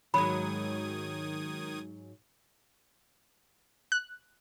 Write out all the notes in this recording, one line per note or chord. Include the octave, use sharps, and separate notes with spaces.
G#2 D#3 F#3 B5 D#6 G#6
F#6